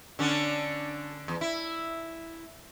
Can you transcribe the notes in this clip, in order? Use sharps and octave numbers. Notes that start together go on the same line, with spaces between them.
D3 C#4 D4
E2
E4